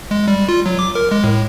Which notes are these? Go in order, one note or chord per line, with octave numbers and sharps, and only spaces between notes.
G#3
G3
F4
F#3
D6
A#4
G#3
A2